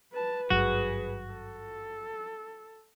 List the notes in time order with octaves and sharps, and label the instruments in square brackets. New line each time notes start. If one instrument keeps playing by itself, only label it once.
[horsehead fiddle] B4 A5
[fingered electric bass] G#1 G2 F#3 [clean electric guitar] F#4 [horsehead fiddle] G#4 B4
[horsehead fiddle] A4